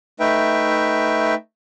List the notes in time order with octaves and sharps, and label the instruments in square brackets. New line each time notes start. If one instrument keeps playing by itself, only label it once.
[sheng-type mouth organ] A3 D#4 B4 E5 G5